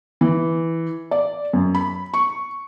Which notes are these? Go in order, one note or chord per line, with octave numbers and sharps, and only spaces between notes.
E3
D5
F#2
B5
C#6